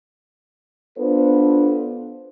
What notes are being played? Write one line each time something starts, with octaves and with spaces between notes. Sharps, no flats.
B3 D4 F4 A4 B4 C5